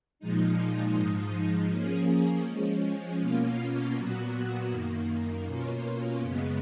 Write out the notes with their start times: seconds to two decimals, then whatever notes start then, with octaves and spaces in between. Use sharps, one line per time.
0.19 A#2 F3 G#3 D#4
0.95 G#2 F3 G#3 D#4
1.70 F3 A#3 C#4 G#4
2.45 F3 G#3 C#4
3.20 B2 A#3 C#4 F4
3.95 A#2 F#3 B3 F#4
4.70 F#2 D#3 A#3
5.46 B2 A#3 C#4 F4
6.20 F#2 C#3 G#3 B3